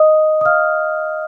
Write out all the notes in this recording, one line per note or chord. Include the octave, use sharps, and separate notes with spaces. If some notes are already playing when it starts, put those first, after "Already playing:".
Already playing: D#5 D#6
D#6
F5 F6